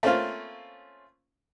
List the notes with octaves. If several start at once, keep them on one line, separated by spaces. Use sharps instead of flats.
A3 A#3 C4 C#4 F4 F5